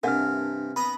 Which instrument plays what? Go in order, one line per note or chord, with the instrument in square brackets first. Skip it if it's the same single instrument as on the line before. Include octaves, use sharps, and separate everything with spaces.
[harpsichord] G2 C3 [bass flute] D4 [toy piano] A#4 E5 F#5 [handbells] G#5 F6
[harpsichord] B3 D#5 A#5 [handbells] B5